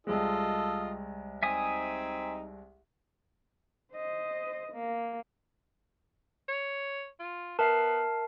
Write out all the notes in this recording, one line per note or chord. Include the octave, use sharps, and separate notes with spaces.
C2 G#3 F4 A4 D#5
C4 D#4 E5 G#5 D#6
C5 D#5
A#3
C#5
F4
B3 A#4 E5 A5 C7